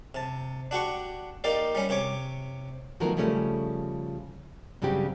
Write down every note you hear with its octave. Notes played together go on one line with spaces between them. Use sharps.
C3 A5
D4 F#4 G4 C#6
A#3 D#4 G4 D5
G3 C#4
C3 G4 C#5 D6
D#3 F3 F#3 A3 B3 A#4
C#3 F3 G3 A3 C#4
G2 C#3 F#3 C4 G4